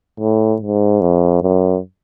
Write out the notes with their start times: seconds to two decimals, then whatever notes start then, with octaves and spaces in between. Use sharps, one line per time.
0.20 A2
0.61 G#2
1.01 F2
1.42 F#2